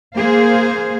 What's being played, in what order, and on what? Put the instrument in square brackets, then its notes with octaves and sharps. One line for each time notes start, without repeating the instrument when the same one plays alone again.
[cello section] A#3 G#4 C5 F5